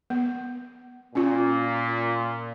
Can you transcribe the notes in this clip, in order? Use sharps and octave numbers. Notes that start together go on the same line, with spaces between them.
B3
A#2 C#4 F4